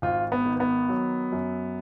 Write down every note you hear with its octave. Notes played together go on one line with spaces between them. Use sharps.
G#1 F4
B3
D#3
B3
F#3
F#2